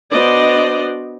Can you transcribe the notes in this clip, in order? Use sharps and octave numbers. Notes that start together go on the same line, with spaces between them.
B3 D4 F#4 C5 D5 D#5